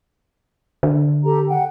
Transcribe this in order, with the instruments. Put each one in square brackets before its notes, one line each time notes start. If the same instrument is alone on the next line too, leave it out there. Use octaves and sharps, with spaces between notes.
[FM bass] D3
[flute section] G4 A4 A#5
F#5 G5